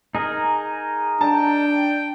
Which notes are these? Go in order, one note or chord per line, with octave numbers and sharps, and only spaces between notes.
D#4 G#4 A#4
D4 G5 A5